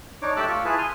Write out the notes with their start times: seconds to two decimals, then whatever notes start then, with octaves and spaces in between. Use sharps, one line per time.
0.22 D4 D#4 C#5 D6
0.36 A3 G4 A5 D6 E6 F#6
0.48 F4 C#6
0.65 E4 G#4 B4 A5
0.78 G#5 C6 F6